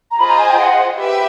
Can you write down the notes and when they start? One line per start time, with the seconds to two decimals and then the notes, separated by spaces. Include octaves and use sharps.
0.11 A#5
0.18 F4 G#4 C5 D#5 B5
0.29 A#5
0.39 G#5
0.48 G5
0.58 F#5
0.98 G4 B4 E5